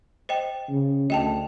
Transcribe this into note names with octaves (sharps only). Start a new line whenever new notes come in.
C5 D#5 G5
C#3
D2 D#5 G5 A5